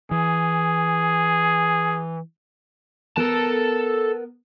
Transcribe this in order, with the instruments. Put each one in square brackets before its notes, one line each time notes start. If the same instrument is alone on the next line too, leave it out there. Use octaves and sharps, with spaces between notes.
[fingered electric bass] E3 [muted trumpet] G#4
[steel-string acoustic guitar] B3 A#4 [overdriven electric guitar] A4 A5